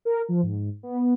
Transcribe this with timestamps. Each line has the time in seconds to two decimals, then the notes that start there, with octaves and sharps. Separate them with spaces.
0.05 A#4
0.28 F3
0.43 G#2
0.83 B3